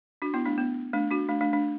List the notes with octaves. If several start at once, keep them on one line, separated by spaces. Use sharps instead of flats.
D4 F#4
B3 E4
A3 D4
B3
A3 D4
D4 F#4
A3 D4
A3 D4
A3 D4